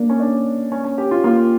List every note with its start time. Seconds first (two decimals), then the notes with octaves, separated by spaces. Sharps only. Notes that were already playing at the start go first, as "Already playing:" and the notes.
Already playing: A#3 D4
0.10 C#4
0.20 D4
0.72 C#4
0.84 C#4
0.98 G4
1.11 F4
1.24 A#3 F4